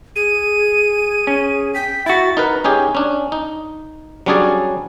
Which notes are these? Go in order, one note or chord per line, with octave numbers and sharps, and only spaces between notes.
G#4 D#7
C#4
G5 B6
E4 F#4 E5 A6
D#4 A#4 B4
C#4 D#4 G4 G#4
C#4 D4
D#4
F#3 G3 C#4 D4 G#4 D5